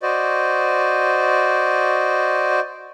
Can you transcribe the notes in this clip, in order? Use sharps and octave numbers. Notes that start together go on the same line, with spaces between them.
F#4 C5 D5 D#5